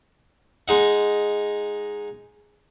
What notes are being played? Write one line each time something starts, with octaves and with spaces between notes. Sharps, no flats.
G#3 D#4 F#5